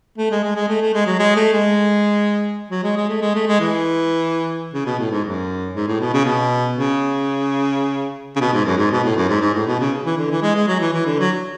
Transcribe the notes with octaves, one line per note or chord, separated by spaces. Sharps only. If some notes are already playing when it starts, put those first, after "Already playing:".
A3
G#3
G#3
G#3
A3
A3
G#3
F#3
G#3
A3
G#3
F#3
G#3
G#3
A3
G#3
A3
G#3
E3
C#3
B2
A2
G#2
F#2
G#2
A2
B2
C#3
B2
C#3
C#3
B2
G#2
F#2
G#2
B2
A2
F#2
G#2
G#2
A2
B2
C#3
E3
D3
E3
G#3
G#3
F#3
E3
E3
D3
F#3